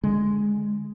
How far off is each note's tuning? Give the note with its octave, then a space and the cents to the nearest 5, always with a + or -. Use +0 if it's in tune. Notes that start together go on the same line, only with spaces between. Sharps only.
D3 +0 G#3 +0